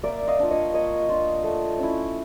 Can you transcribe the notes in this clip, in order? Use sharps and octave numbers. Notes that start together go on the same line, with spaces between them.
A#3 D5 E5
D#5 F5
D4 F4
C#5 D#5
A#3 C#5 D#5
D4 F4
A3
C#4 E4